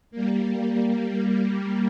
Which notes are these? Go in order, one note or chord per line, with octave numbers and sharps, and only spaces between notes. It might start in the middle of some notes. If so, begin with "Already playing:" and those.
G3 A#3